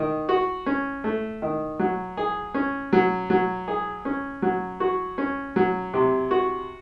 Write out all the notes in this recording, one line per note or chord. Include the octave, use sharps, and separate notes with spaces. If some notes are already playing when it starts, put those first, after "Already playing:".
Already playing: D#3
F#4
C#4
A3
D#3
F#3
G#4
C#4
F#3
F#3
G#4
C#4
F#3
F#4
C#4
F#3
C3
F#4